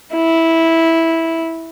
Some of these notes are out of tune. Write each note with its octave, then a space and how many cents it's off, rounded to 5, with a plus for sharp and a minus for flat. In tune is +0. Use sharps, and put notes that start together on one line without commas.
E4 -10